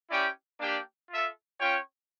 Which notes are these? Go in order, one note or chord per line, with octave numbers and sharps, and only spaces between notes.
C#4 E4 G4 D5 G5
A#3 D4 G4 D5 G5
F4 A4 E5
C#4 F4 C#5 G5